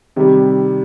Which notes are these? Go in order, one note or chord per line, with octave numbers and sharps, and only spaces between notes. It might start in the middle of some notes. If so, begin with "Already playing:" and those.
C3 D#3 G3